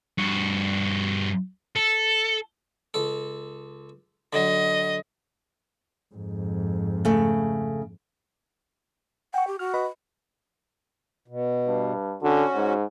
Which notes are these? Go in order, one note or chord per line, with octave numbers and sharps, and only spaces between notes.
G2 F#4
A4
C#2 A4
D3 F#3 D#5
F2 G#2
C#3 A3
F#5 G5 C#6
G4
F#4 F6
B4 D#5 B5
B2
G2
D3 C#4 F#4
G#2